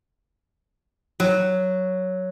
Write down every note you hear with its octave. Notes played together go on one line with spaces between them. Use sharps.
F#3